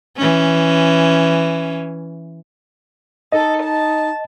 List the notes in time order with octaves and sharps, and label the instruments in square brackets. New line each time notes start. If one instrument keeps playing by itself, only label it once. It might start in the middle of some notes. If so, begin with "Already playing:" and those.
[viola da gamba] E3 C#4
[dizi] D#4 [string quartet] A4 [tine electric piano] D#5
[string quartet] A5